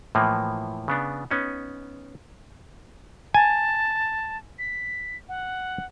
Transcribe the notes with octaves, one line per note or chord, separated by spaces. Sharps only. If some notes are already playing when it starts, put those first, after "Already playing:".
A2 E3 F3 A#3
C#3 B3 D4
B3 C#4 D#4
G#5 A5
B6
F#5